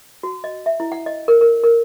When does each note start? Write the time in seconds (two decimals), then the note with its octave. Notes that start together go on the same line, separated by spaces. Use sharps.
0.23 F#4
0.44 D#5
0.66 E5
0.80 E4
0.92 F#5
1.06 D#5
1.28 A#4
1.41 A#4
1.63 A#4